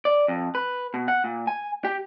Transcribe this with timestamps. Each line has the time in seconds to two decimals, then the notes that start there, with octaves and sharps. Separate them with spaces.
0.05 D5
0.28 F2
0.55 B4
0.94 B2
1.08 F#5
1.24 A#2
1.47 G#5
1.85 G4